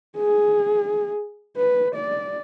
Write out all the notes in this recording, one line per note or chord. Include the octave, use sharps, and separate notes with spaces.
G#4
B4
D5